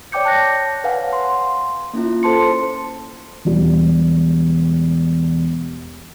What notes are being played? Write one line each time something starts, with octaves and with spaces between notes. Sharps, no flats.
C#5 D5 G5 D6 G6 C#7
A5 F#6 A#6
B4 C#5 F5 F#5 G#5
C6
A#3 C#4 E4 F4
A4 C5 A5 C6 C#7
E1 G3